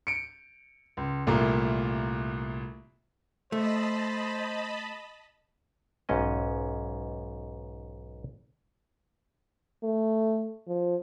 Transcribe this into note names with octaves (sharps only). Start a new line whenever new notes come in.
C#7 D7
C#2
C2 A#2 A3 A#3 A#5
A3 C5 D#5 A5 B5
B1 G#2 C#4 D#5
A3
F3